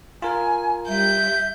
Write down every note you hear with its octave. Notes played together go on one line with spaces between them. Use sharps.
F4 A#4 G#5
G3 E5 G6